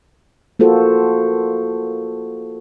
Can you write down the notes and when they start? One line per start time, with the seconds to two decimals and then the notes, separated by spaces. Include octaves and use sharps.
0.59 A#3 F4 F#4 A4 C5